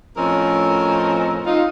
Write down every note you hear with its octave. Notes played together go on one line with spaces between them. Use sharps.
A2 F3 C4 C#4 A#4 D#5
D#4 F4